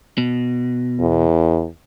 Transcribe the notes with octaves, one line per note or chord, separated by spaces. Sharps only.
B2
E2